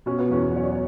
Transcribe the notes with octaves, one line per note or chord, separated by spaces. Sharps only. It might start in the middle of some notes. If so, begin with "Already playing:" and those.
B2 C#4
B3
E2 C#4
F#3 C#5
D5
C#5